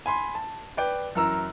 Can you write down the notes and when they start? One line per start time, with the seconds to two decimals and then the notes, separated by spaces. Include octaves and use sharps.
0.06 G#5 B5 C6
0.35 A5
0.77 B4 D5 G5
1.15 F#2 E3 A#4 A#5 E6